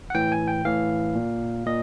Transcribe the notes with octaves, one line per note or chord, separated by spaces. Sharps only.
F#5
A2 E3 G5
G#5
G5
A2 E3 F5
A#2
A#2 D#5